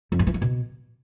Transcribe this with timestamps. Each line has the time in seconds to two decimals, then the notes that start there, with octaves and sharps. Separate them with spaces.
0.12 F2
0.19 G2
0.27 E3
0.34 F3
0.42 B2